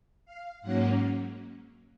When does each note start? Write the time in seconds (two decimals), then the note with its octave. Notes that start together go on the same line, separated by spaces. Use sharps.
0.25 F5
0.62 G#2 F#3 A#3 C#4 F#5